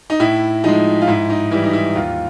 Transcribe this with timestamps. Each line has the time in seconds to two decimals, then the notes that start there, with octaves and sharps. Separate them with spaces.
0.10 D#4
0.20 A2 E4
0.64 F3 G#3 D#4
1.02 F4
1.07 G#2 E4
1.30 D#4
1.51 E3 G3 E4
1.64 D#4
1.73 E4
1.95 D#2 F4